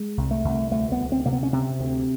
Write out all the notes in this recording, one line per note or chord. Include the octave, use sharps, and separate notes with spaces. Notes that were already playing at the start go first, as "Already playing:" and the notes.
Already playing: G#3
C2
A3
C2
D2 A3
B3
D2
C4
C3 A#3
B3
C#4
C3 C4
D2